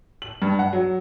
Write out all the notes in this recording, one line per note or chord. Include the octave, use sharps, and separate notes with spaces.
F#7
G2
F#5
F#3